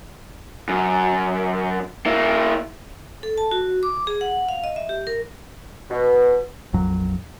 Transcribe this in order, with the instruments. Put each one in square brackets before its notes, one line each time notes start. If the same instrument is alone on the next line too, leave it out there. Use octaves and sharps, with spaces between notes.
[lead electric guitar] F#2
A#3 E4
[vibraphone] A4
A5
F#4
D6
G#4
F#5
F5
D#5
E5
G4
A#4
[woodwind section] B2
[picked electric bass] A#1 F2 F#3